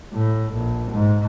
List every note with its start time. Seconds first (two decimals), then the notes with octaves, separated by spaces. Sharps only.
0.13 A2
0.55 A#1
0.92 G#2